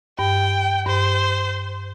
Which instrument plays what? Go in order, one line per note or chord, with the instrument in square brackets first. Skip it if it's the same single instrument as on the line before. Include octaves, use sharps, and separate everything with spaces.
[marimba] G2 [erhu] G5
[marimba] G2 [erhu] C5